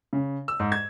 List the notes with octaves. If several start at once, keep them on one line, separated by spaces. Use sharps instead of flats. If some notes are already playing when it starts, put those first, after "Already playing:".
C#3
E6
G#2
G#6